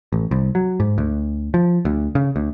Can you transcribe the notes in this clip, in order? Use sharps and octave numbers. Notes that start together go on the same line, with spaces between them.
A1
C2
F#3
G#2
D2
F3
D2
C#3
D2